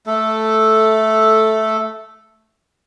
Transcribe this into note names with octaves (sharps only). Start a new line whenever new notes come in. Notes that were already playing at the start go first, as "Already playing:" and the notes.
A3 A4